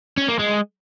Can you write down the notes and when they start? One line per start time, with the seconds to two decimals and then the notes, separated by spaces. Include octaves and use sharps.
0.18 C#4
0.28 A#3
0.39 G#3